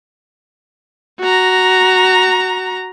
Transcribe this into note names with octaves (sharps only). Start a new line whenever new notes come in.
F#4 A#5